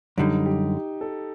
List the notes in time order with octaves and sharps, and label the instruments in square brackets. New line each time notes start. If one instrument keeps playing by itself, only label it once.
[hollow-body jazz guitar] F#2 D3 G3 [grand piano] D#4
[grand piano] G4
A4